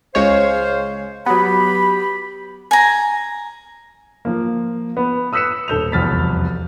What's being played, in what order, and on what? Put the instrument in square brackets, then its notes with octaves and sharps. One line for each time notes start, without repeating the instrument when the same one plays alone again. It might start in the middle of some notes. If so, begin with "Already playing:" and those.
[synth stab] C#2 G#3 C#5 [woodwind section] C5 F5
[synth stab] F#3 B3 [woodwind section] G4 B5
[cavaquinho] G#5 A#5
[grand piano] F3 A#3
B3
D#6 E6 F#6 B6 C#7 E7
D#1 A4 G6 F7
E1 C2 F2 F6 A6 B6